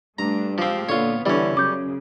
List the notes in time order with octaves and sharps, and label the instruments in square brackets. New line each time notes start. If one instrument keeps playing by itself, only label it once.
[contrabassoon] G2 [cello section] A3 D4 [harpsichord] A#5
[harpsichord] F3 C4 [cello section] G#3 G4 F5
[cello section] A#2 B3 [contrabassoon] D3 [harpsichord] F4 C#5
[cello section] D3 [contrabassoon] E3 [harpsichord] G3 C#4 [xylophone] D5
[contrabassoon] F#2 [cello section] C#3 [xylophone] D6 G6